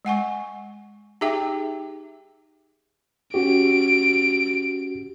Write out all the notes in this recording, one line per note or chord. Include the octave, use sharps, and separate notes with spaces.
G#3 F#5 G#5 C#6
D#4 G4 G#4 E5 G5 D6
C#4 F#4 G4 D7